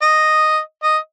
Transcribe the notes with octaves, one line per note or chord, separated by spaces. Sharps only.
D#5
D#5